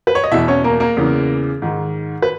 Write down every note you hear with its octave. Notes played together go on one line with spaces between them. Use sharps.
B4
C#5
D#5
E2 B2 E4 E5
C#4 C#5
A#3 A#4
A#3 A#4
E2 C#3 E3
G#2 D#3
B4